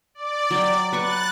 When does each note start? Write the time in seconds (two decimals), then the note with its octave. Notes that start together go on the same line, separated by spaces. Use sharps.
0.15 D5
0.51 F#3 G5
0.93 B4 C#6 D6 F#6 A6